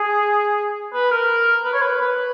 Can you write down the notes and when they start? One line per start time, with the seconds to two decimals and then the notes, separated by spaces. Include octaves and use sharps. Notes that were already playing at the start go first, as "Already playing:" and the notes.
Already playing: G#4
0.94 B4
1.11 A#4
1.65 B4
1.74 C#5
1.82 B4
2.01 B4